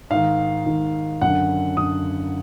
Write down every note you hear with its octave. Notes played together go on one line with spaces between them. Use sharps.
G#2 D#3 F5
G#2 D#3
F#2 D3 F#5
F#2 D3 D#6